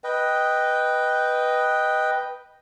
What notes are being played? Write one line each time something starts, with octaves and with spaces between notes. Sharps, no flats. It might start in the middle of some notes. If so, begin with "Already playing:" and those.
B4 D#5 G5